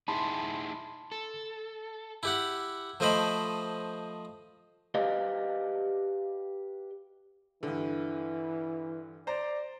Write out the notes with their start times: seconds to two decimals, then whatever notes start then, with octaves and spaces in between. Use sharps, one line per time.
0.08 D#4 E4 G#4 A5 B5 C6
1.12 A4
2.23 E4 G4 F#5
3.00 F3 A3 C5 D#5 G5 B5
4.95 G4 B4 D5 D#5 F5
7.63 G2 D3 E3
9.27 C5 D5 A#5